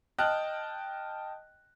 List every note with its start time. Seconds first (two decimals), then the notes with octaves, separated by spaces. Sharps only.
0.18 D#5 G5 A5 F6 F#6